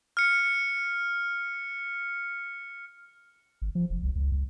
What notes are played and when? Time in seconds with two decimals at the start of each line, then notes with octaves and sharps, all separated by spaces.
0.17 F6 C#7
3.62 G#1
3.75 F3
3.90 F1
4.03 C2
4.16 C#2
4.32 C#2